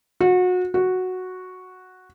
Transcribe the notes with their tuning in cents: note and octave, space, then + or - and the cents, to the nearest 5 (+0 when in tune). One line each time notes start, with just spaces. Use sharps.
F#4 -30
F#4 -5